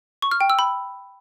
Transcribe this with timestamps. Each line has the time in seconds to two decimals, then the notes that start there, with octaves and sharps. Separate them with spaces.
0.22 C#6
0.31 F6
0.41 G5
0.50 E6
0.59 B5